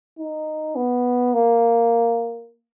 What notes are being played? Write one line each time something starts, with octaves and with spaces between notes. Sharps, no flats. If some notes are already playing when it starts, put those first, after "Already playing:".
D#4
B3
A#3